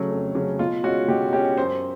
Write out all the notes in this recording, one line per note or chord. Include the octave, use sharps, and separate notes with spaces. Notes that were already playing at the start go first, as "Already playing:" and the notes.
Already playing: C#3 F#3 A3 C#4
F2
C#3 F#3 A3 C#4
B2 F4
G#3 C#4 F#4
B2 G4
G#3 C#4 G4
F#2 C5